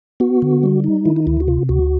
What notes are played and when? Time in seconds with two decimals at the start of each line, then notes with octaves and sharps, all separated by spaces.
0.20 B3 F#4
0.42 D3
0.63 G3
0.84 D#4
1.05 D#3 E4
1.16 D#4
1.27 D2 E4
1.40 F#4
1.48 C3 F4
1.69 D2 F#4